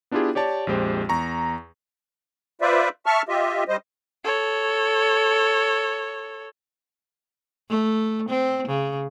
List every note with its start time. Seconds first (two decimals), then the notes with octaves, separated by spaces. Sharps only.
0.11 B3 D4 E4 F4 G4 G#4
0.35 G4 C#5 D5 A5
0.67 A#1 F2 G#3 G4 C5
1.09 E2 A#5 C#6
2.61 F4 B4 C5 D5 E5
3.06 E5 A5 C#6 F6
3.29 F4 G4 D#5 E5
3.68 G3 C5 D#5
4.24 A4 C#5
7.70 A3
8.29 C4
8.68 C#3